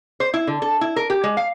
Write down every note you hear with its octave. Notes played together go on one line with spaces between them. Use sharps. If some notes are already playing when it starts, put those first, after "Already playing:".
C5
E4
D3
A4
E4
A#4
G4
G#3
F5